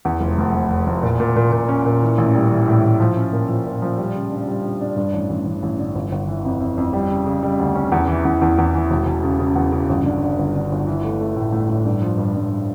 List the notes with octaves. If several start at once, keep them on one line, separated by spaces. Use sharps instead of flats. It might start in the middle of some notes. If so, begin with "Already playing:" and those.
E2
F1
F1
F1
F1
F1
A#2
A#2
A#2
A#2
C#4
A#2
E3
A1
G3
E3
A2
A1
F3
C#4
A#2
F3
A#2
F3
G3
C#3
D4
G3
D4
D4
G2
A1
A1
A1
A1
D3
G1
G1
E3
F2
F2
F2
G3
C#3
C#3
G3
D2
C#4
E2
E3
E2
E2
E2
E3
E1
E1
C#3
C#3
E2
C#3
G1
D3
D3
G1
D3
G1
E3
A3
A3
A2
A2
A2
G2
F3
G2
G2